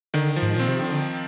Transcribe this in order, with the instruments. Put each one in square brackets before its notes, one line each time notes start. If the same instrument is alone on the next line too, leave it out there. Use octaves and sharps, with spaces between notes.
[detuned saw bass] D3 [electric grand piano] D#3
[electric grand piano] F3
[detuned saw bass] G#2
[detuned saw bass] A#2 [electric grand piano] C4
[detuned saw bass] C3
D3